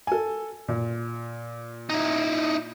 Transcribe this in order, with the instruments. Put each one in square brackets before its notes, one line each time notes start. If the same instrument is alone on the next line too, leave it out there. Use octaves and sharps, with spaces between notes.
[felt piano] A4 G#5
A#2
[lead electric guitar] D#4 E4